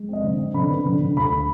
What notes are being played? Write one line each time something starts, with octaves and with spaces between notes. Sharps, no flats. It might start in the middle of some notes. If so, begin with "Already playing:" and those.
Already playing: G#3
C4 D#5
D3
C4
D3 B5
B3
D3
D3
D2 B5